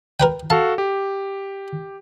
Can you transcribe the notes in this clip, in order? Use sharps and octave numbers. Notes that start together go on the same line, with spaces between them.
A#4 B4 G5
F#4 A4 F5 A5
G4